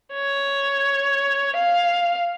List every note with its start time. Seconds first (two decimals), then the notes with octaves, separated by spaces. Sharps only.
0.14 C#5
1.56 F5